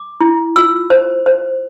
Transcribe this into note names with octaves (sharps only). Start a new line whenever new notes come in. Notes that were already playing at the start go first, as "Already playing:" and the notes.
Already playing: D6
E4
F4 E6
C5
C5